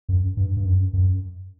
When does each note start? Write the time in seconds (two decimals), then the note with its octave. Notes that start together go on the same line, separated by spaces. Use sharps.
0.09 F#2
0.37 G2
0.57 G2
0.65 F#2
0.93 F#2